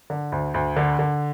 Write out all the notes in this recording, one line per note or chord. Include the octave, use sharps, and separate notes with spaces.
D3
D2
D2
D3
D3